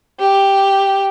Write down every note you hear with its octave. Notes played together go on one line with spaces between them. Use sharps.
G4